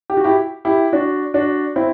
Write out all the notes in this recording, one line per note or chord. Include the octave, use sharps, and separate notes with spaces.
G4
F#4
E4 G4
E4 G4
D4 F#4
D4 F#4
C4 E4